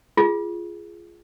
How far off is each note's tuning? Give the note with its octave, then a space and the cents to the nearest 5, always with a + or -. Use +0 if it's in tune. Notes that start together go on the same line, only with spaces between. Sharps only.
F4 -20 G#4 +0